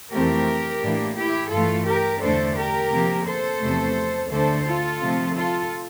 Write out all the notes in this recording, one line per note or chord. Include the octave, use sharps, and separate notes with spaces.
F2 E3 A3 C4 G4 A#4
A2 E3 A#3 D4
E4 G4
G2 E3 A3 F4 A4
G4 A#4
E2 D3 A3 D4 A4 C5
G4 A#4
C3 F3 A#3
A4 C5
E2 C3 F3 A3
D2 D3 A3 D4 A4 C5
F4 A4
C3 F3 A3 C4
F4 A4